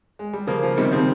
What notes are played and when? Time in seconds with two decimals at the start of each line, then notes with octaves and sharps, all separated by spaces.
0.19 G#3
0.33 G3
0.47 C#3 F3 A#3
0.63 F3
0.77 C3 D#3 G3
0.92 C#3 F3 C4